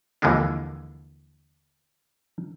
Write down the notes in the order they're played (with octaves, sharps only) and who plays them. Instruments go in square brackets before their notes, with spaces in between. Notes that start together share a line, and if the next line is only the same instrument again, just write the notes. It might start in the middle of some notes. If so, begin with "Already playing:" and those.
[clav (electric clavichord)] D#2 D3 E3 F3 G#3 D4